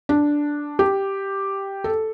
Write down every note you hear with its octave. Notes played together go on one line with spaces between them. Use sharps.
D4
G4
A4